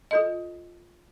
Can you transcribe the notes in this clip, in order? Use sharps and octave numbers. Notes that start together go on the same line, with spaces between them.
F4 A4 D#5